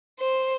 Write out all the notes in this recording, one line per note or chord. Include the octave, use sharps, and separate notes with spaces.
C5